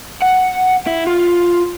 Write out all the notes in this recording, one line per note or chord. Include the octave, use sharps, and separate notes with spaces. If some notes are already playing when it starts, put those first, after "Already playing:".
F#5
E4
F4